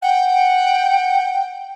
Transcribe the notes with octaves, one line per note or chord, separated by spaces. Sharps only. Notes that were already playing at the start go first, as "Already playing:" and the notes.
F#5 G5